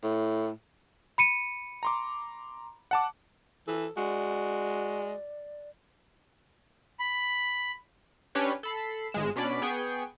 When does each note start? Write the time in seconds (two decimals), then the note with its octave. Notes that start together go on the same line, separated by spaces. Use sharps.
0.03 A2
1.18 B5 C#7 D#7
1.83 A#5 C6 D6
2.91 F#5 A5 D6
3.67 E3 A4
3.97 G#3 F#4 D5
7.00 B5
8.35 C#4 D4 G4 B4 C#5
8.63 A4 B5 C7
9.12 G#1 G#3 E7
9.36 B2 C#4 D4 D5 B5 D7
9.62 B3 G#4 G5 C#6